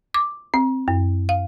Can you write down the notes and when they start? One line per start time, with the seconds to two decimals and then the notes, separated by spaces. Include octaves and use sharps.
0.14 D6
0.54 C4
0.88 F#2
1.29 F5